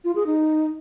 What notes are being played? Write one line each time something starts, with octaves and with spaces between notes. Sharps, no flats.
F4
G#4
D#4